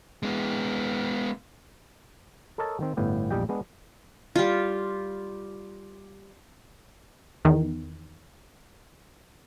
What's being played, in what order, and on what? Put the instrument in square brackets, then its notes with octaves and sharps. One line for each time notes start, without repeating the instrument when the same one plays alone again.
[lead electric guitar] G#3 B3
[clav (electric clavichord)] A4 A#4 C#5 D#5 A5
D#3 C4
G1 A2 B3 G4
A#1 E2 G3 G4 D#5 G5
G#3 B3 D4
[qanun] G3 F4
[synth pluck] E2 D#3